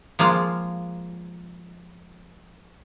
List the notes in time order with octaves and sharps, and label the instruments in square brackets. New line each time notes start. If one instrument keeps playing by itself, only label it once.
[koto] F3 G#3 A#3 F4